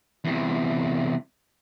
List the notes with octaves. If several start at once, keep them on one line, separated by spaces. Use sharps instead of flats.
E2 C3